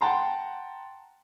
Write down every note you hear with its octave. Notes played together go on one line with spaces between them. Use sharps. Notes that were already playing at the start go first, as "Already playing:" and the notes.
F#5 G5 A5 A#5 C6